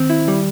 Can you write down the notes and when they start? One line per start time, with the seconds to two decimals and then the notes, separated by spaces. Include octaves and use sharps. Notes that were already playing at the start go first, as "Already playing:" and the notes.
Already playing: D#3 C4
0.10 E4
0.28 G3